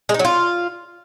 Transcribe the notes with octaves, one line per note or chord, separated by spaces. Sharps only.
G#3
D#4
F#3
F4